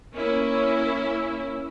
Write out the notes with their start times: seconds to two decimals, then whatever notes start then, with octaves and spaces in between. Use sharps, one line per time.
0.14 A#3 C#4 E4